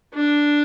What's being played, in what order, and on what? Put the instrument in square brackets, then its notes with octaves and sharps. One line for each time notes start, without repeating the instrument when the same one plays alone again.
[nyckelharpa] D4